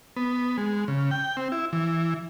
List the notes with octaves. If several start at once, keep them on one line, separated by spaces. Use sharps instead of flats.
B3
G#3
C#3
G5
C4
E4
E3